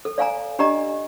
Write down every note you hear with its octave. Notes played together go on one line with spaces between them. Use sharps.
A4
D5 F5 G#5 A#5
D4 G4 D5 D#5 A#5